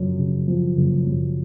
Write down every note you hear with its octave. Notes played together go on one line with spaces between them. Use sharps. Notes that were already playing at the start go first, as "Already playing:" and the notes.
Already playing: F#1 F#2 F3
C#3
F3
F#1
F#2